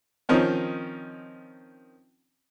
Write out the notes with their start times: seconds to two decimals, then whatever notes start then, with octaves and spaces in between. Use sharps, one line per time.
0.29 D#3 F3 C4 C#4 D#4